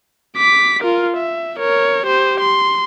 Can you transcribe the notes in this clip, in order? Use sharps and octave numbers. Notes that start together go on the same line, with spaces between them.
D6 B6
F4 A#4
E5
A#4 C#5
G4 C5
C6